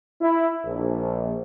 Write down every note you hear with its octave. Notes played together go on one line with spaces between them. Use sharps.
E4
A#1